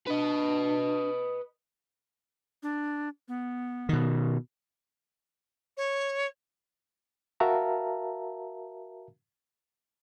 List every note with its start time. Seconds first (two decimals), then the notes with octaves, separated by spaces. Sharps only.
0.07 D4 B4 D#5
2.63 D4
3.28 B3
3.89 B2 D#3
5.77 C#5
7.40 F#4 A#4 E5 F5 A5 A#5